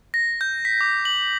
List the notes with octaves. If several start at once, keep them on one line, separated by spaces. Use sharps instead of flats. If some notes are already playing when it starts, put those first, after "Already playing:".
A#6
G6
B6
D6
F#7